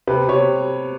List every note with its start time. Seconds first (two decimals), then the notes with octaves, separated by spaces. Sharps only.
0.07 C3 B4
0.28 C3 C#5